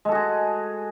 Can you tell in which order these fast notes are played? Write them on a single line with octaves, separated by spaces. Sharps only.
G#3 A4 F#4 G#4